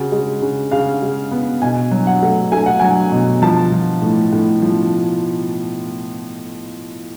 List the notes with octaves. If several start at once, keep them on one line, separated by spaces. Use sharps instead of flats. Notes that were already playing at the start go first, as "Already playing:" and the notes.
Already playing: C#3 F#4
G#3
C#3
C#3 F5
G#3
B3
B2 G#5
F#3
F#5
A3
A3 G#5
F#5
F#3 G#5
B2
F3 A5
F3
A2
A2
F3